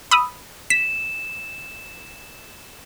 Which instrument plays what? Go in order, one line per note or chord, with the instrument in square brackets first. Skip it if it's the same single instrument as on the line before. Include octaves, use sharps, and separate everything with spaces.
[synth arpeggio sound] B5 D#6 E6
[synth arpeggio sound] B6 [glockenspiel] E7